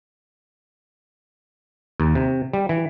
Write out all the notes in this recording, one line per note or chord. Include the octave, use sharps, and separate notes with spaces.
D#2
C3
G3
E3